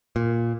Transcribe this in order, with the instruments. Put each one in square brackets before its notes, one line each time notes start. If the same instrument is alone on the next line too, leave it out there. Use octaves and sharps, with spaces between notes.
[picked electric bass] A#2